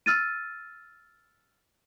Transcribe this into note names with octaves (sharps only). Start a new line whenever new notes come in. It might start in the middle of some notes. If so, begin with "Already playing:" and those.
E6 F6 A6 D#7